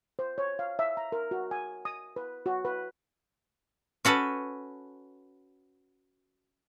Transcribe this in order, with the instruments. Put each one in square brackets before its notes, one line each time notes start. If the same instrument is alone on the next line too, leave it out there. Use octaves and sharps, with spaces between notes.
[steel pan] C5
C#5
F5
E5
A#5
A#4
F#4
G#5
D#6
B4
F#4
B4
[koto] C#4 F#4 A4 B4